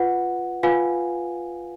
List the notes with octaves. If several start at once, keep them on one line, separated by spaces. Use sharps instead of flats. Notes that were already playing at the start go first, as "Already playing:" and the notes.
Already playing: F4 B4 F#5
F4 B4 F5 G#5